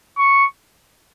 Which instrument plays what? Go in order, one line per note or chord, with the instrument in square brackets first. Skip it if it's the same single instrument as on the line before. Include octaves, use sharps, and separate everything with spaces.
[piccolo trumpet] C#6